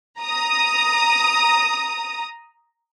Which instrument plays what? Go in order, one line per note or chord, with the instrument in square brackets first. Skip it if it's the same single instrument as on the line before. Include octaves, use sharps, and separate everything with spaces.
[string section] A#5 D#6